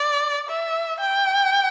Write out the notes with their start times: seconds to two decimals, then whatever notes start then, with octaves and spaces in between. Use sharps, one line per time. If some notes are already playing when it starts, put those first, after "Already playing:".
Already playing: D5
0.49 E5
1.01 G5